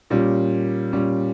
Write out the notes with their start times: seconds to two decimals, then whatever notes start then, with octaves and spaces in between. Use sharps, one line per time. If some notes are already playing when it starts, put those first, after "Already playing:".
0.10 A#2 G3 C#4
0.93 A#2 G3 C#4